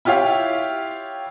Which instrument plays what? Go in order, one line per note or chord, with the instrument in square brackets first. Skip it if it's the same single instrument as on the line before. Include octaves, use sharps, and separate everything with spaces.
[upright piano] E4 F4 G4 C#5 F5